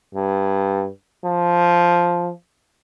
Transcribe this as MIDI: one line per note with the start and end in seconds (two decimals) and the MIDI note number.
0.15 0.87 43
1.25 2.30 53